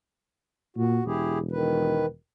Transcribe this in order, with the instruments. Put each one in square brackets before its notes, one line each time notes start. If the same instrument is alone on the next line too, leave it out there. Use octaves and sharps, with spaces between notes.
[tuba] A#2 [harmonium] F#4
[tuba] E1 [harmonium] E4 G4 G#4
[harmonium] D#3 B4